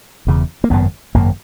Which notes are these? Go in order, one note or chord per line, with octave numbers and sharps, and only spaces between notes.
E1 E2 C#3
A#3
G#1 F#2 C#3 B3
G#1 F#2 C#3 A#3